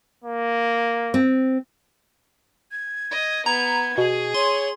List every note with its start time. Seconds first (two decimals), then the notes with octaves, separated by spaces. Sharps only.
0.24 A#3
1.14 C4
2.72 G#6
3.11 D#5
3.46 B3 A#5 G#6
3.98 B2 G#4
4.34 C#5 C6